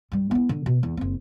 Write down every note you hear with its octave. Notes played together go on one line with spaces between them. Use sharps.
G2 G3
B3 E4
D3
B2
E2
F#1 C4